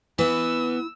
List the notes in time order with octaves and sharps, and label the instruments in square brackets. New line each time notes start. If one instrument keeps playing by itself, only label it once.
[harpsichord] E3 [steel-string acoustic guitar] B3 B4 [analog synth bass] E4 [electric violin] E6